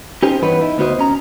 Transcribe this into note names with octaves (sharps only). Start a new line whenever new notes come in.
C#4 D#4 G4 C5 G#5
G2 E3 B3 D#4 B4 C#5
D#4 E4
D2 B3 F#4 C5 D#5
C#4 A#5